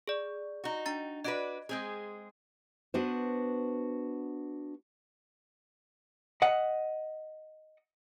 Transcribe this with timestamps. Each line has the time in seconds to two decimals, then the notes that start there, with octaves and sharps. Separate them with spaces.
0.08 G#4 D5
0.64 D#4 F#4
0.86 D4 A#5 A6
1.24 D4 F#4 B4 D#5 D7
1.69 G#3 C4 G#4
2.94 B3 D4 F#4 B4 C5
6.42 D#5 F#5